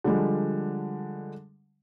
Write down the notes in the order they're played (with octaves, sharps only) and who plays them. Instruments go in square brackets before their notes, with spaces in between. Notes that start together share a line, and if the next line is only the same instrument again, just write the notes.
[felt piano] D3 F3 G3 G#3